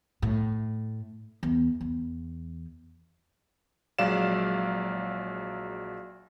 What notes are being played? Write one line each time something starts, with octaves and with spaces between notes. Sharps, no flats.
A2
E2
E2
A#1 F#3 G#3 D5 F5 E7